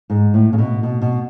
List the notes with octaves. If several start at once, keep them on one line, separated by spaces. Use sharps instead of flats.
G#2
A2
C#3
B2
B2
B2